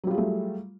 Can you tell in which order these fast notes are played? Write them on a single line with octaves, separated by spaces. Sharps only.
F#3 G3 F4 G#4 A3